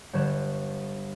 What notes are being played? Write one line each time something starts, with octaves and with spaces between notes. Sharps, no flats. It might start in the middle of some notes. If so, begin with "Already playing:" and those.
G1 G3 C#5 F#6 E7